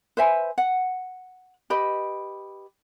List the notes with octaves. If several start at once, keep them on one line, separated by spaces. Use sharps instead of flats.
B4 C5 E5 G#5
F#5
G4 B4 D#5 B5